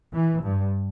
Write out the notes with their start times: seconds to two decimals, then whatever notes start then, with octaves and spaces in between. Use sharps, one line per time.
0.13 E3
0.42 G2